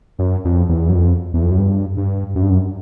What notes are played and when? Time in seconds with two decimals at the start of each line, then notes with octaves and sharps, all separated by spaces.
0.19 F#2
0.45 F2
0.69 E2
0.89 F#2
0.95 F2
1.34 E2
1.42 F2
1.51 F#2
1.58 G2
1.97 G2
2.35 F#2
2.43 G2
2.50 F#2